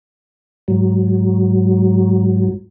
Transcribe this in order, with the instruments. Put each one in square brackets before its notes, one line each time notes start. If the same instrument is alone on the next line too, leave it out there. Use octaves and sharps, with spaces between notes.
[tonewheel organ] G#2 F#3